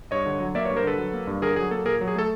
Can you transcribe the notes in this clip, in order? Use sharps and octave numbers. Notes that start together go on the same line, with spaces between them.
G2 C#5 D#5
D3
F#3
A#3 D5 E5
B4 C#5
G2
A#4 C5
D3 A4 B4
F#3
A#3
G2
D3 G#4 A#4
F#3 G#4
A#3 A4
A#2 G#4 A#4
F#3
G#4
A3 A4